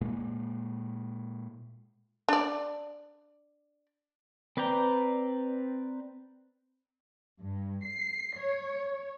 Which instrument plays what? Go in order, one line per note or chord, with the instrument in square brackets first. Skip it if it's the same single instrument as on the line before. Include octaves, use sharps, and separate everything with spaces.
[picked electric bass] A#2 G#3
[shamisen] D4 D5
[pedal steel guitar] C4 B4 D5 G5 A#5
[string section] G2
C7
C#5